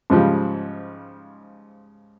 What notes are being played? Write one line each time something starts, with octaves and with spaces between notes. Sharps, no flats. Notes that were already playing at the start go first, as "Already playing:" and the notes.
G#2 C#3 F3 G3